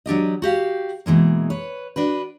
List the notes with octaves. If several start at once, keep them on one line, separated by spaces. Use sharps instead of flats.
F#3 D4 G4 D#5
F#4 G4 F5
B2 E3 G#3 A#3
B4 C#5
D4 F#4 B4